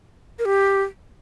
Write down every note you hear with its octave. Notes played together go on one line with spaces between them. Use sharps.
A#4
G4